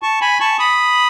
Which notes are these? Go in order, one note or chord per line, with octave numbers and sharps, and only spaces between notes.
A5 C#6
G#5 B5
A5 C#6
B5 D#6